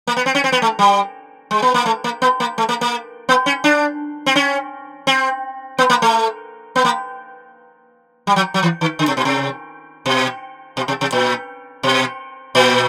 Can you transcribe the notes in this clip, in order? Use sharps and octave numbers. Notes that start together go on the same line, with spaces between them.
A#3
B3
C4
C#4
C4
B3
A3
G3
G#3
B3
A#3
A3
A#3
B3
A#3
A3
A#3
A#3
B3
C#4
D4
C4
C#4
C4
B3
A#3
A3
B3
A#3
G3
F#3
F#3
E3
D#3
D3
C3
B2
C3
B2
B2
C3
C3
A#2
B2
A#2